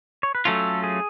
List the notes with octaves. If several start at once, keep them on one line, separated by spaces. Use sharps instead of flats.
C#5
B4
F#3 A3 C#4 F4 A4
G#4